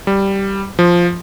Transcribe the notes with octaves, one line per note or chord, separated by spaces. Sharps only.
G3
F3